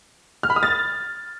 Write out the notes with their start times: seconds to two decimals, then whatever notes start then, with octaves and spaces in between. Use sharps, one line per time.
0.43 F6
0.50 B5
0.56 D#6
0.63 A6